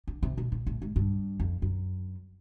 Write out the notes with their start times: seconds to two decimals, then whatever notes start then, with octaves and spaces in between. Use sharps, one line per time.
0.07 D3
0.23 C3
0.38 B2
0.52 A#2
0.67 A2
0.82 G#2
0.96 G2
1.40 F2
1.62 F#2